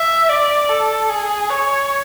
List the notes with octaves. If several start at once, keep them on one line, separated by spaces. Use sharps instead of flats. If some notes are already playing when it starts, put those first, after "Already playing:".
Already playing: E5
D5
A4
G#4
C#5